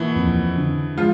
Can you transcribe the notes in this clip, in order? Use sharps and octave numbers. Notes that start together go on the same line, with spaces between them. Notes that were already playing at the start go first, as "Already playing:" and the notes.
Already playing: B2 E3 A#3 E4
F2
D3
F3 G#3 F4